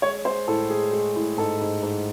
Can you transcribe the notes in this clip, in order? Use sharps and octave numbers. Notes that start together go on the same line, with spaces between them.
G#3 C#5
G#3 C5
A2 A4
G#3 G#4
G#3
A2
G#2 A4
G#2
G#2